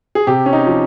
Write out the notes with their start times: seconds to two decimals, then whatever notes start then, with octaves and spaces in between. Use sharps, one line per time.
0.15 G#4
0.27 C3 G4
0.46 C#4
0.53 D#4
0.66 F3